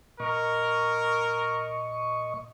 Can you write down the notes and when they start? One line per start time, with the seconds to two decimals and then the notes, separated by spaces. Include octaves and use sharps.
0.20 A#2 A#4 D#5 C#6